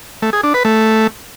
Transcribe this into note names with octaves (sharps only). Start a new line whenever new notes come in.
A3
G#4
D4
B4
A3